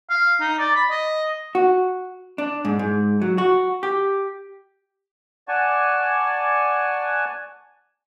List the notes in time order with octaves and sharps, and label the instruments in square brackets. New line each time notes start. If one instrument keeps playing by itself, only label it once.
[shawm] F5
D#4
D5
B5
D#5
[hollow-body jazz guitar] F#4
D4
G#2
G#2
F#3
F#4
G4
[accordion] D5 F#5 G#5 A5 C#6